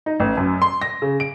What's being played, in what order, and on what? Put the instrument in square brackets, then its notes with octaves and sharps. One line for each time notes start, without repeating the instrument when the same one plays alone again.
[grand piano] D#4
A1
F#2
C6
A#6
C#3
D7